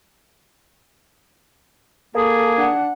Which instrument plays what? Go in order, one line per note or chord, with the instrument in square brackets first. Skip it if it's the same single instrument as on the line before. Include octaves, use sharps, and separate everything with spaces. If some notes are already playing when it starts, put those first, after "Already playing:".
[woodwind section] A#3 G#4 [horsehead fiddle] A4
[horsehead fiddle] D4 F#5